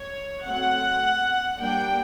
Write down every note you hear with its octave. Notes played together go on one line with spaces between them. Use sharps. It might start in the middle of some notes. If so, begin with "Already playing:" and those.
Already playing: C#5
F#3 A3 C4 F#5
G3 A#3 D4 G5